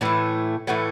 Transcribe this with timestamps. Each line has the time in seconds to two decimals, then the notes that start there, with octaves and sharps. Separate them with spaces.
0.01 A2 E3 A3 E4
0.67 A2 E3 A3 F#4